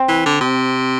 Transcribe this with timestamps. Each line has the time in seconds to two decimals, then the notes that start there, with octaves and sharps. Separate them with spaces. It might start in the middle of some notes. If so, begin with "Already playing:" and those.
Already playing: C4
0.08 E3
0.25 D3
0.41 C3